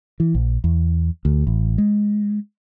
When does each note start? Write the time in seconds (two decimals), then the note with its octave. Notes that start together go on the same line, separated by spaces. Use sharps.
0.20 E3
0.35 A#1
0.64 E2
1.25 D2
1.47 A1
1.78 G#3